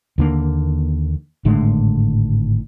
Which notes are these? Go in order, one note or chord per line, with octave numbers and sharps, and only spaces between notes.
D#2 D3 A#3
G#1 A2 D3 G#3